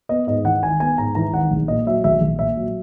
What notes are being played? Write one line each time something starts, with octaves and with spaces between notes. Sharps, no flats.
B3 D#5
G#2 D#5
E3 F#5
G#1 G#5
B3 G#5
G#2 A#5
E3 A#5
G#1 F#5
A#1
A#2 D#5
F#3 E5
A#1 E5
A#1
A#2 E5
F#3